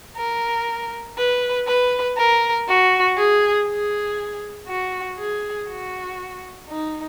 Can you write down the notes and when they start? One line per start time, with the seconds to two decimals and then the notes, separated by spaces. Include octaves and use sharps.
0.17 A#4
1.18 B4
1.67 B4
2.17 A#4
2.68 F#4
3.17 G#4
3.67 G#4
4.68 F#4
5.18 G#4
5.68 F#4
6.68 D#4